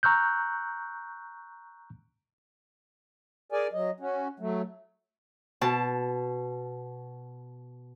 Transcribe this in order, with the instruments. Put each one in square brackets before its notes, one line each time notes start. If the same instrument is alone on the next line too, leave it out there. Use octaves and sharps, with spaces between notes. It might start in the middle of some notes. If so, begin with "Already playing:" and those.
[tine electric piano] A#5 C#6 E6 F#6 G6
[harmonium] G#4 A#4 D5 G#5
F#3 D#5
C#4 F#4
F#3 A3
[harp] B2 A5